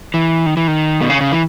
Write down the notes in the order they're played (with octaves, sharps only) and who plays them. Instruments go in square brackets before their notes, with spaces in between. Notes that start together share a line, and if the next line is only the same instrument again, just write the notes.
[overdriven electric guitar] E3
D#3
E3
D#3
B2
C#3
C#3
E3